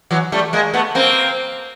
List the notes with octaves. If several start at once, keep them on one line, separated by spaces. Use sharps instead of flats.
E3 F#3
G3 A3
G#3 A#3
A3 B3
A#3 C4